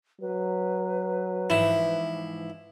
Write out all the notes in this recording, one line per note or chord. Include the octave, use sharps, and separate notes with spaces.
F#3 B4
G#2 E3 F3 E4